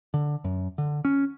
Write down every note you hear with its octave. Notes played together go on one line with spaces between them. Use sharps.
D3
F#2
D3
C#4